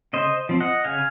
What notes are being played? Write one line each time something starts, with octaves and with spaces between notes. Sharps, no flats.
C#3 C5 D#5
F3 C4
D#5 F#5
C#3 F5 G#5